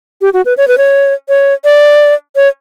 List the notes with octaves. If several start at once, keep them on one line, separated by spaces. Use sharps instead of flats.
G4
F#4
B4
C#5
B4
C#5
C#5
D5
C#5